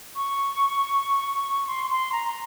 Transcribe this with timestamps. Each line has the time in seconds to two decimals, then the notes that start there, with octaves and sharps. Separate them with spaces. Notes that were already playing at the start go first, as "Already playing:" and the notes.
0.15 C#6
1.68 C6
1.91 C6
2.12 A#5